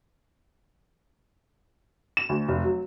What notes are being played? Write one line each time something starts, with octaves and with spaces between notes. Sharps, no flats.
E7
D2
F1
F#3